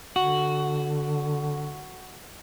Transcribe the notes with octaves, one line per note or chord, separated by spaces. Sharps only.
D3 F#4